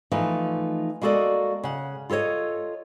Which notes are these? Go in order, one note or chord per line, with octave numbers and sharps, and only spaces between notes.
E3 F3 A3 D#4 F4
G#3 A#3 F#4 A4 D5 D#5
C#3 F#5
F4 A4 A#4 C#5 D#5